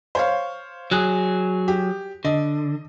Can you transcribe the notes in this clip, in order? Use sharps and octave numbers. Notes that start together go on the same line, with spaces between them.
C5 C#5 F5
F#3 G#4 F#6
G4
D3 D#5